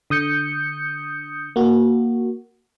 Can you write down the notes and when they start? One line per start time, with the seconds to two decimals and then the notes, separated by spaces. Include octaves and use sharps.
0.10 D3 D#6 G6 C#7
1.56 A#3 F#4